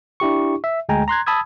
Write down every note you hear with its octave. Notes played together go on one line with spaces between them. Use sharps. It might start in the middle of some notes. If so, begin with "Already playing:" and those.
D4 E4 G4 C#6
E5
D2 G#3 G5 G#5 A#5
A#5 C6 F#6 G#6
A5 B5 D#6 E6 G#6